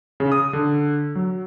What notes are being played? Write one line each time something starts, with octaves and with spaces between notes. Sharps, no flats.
C#3
D#6
D3
F#3